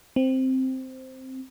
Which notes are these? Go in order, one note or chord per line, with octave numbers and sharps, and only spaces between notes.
C4